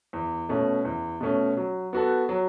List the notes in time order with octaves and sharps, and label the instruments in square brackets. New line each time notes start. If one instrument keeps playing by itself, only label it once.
[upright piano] E2
B2 A3 C#4
E2
B2 A3 C#4
F#3
B3 F#4 A4
F#3